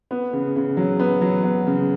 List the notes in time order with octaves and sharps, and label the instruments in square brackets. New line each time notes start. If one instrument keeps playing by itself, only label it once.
[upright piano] B3
C#3
C#3
F#3
B3
F#3
B3
C#3